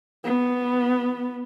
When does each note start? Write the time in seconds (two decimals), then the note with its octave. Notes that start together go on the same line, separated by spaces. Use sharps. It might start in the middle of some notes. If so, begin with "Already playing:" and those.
0.24 B3